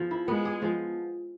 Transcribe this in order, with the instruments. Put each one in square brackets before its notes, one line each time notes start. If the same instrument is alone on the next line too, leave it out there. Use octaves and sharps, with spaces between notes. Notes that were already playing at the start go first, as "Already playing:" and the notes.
Already playing: [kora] F3 B3 G#4
E4
[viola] G#3 [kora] B3
[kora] G#4
F3